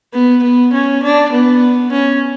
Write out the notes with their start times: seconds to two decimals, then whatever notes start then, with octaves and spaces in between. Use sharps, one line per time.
0.13 B3
0.43 B3
0.73 C#4
1.03 D4
1.32 B3
1.92 C#4